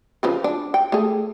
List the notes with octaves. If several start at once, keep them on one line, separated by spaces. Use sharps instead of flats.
C#3 F3 B4
D4
G5
A3 G#4